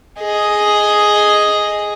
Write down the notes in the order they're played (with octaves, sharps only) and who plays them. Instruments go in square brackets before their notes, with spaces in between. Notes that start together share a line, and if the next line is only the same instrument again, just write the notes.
[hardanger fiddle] G#4 D#5